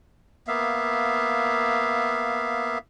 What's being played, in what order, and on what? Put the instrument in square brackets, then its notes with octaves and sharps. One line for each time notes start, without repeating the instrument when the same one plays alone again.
[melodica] A#3 B3 E5 F5